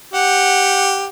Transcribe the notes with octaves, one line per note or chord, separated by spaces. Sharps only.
G4 F#5